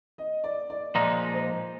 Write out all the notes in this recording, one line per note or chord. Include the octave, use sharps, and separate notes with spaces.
D#5
D5
D5
A#2 F3 G#3 D#4 D5
C5